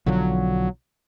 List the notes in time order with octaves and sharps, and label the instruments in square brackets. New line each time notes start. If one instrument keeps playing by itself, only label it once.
[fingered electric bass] B1 D3 F3 [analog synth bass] F#3